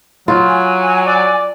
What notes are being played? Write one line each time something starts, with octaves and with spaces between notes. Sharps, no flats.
F#3 F4
G#5
D5